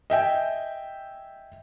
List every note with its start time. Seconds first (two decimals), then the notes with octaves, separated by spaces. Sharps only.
0.10 D#5 E5 G5 G#5